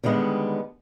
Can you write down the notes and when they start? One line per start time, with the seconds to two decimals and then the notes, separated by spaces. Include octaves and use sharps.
0.04 D3 D#3 G3 G#3 B3